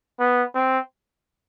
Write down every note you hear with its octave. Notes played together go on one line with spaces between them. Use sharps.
B3
C4